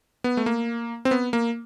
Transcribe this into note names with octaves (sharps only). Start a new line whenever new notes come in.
B3
A3
A#3
C4
B3
A#3